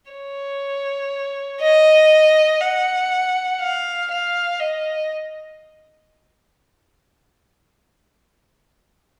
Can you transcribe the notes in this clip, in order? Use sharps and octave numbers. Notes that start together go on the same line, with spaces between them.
C#5
D#5
F#5
F5
F5
D#5